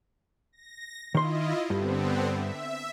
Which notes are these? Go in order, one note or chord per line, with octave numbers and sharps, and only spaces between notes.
A#6
D#3 E4 F4 D#5 C6
G2 D3 B3 C4
E5